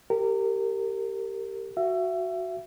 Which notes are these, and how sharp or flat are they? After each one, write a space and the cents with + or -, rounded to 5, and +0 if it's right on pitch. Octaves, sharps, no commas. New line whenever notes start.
G4 +0 A#4 -25
F#4 +0 E5 +30